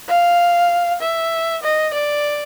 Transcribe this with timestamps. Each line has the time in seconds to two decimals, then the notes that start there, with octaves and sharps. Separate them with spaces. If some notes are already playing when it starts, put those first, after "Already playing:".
0.09 F5
1.01 E5
1.63 D#5
1.94 D5